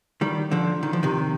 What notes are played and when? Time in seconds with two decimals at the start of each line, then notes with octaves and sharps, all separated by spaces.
0.21 D#3 G3
0.51 D3 F3
0.83 D#3
0.93 F3
1.03 C3 D#3